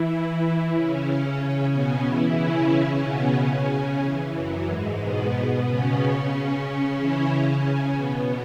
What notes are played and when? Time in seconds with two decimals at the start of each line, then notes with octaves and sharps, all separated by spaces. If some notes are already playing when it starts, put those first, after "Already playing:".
Already playing: E3 E4
0.74 C#3 C#4
1.73 B2 B3
2.05 E3 E4
2.38 C#3 C#4
2.71 C#3 C#4
3.03 B2 B3
3.36 C#3 C#4
4.02 E3
4.34 F#2 F#3
4.67 G#2 G#3
5.00 B2 B3
5.65 C#3 C#4
6.96 E3 E4
7.29 C#3 C#4
7.94 B2 B3